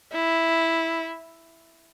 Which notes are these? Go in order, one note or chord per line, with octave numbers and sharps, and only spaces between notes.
E4